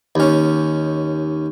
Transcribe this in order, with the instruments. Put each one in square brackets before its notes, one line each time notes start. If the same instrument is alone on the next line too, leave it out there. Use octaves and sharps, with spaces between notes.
[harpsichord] D#2 C#4